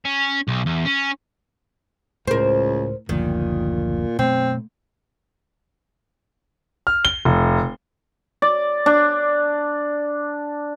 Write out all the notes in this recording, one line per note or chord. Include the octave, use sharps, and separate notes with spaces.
C#4
B1
E2
C#4
C#2 A2 A#4 C5
F#1 D2 A#2 D#3 F3
F#2 B2 A3 B3 C4
F6
G7
F1
D5
D4